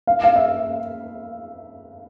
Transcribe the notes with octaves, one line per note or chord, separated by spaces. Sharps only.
F5
F5
E5